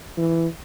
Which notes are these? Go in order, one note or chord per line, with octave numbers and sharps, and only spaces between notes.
E3